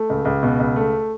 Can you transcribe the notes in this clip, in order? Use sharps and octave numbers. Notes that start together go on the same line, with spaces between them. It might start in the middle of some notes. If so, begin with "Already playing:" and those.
Already playing: A3
C#2
C#2
B2
C#2
A3